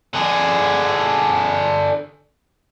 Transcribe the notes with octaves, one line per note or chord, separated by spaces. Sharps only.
D3 G#4